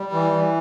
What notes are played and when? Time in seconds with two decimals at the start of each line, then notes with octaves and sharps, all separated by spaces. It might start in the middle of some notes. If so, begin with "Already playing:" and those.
Already playing: G3
0.12 E3
0.32 E3